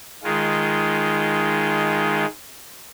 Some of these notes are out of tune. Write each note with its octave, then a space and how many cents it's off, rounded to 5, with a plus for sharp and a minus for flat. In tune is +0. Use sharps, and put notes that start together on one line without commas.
D#3 +0 G#3 +5 F4 -20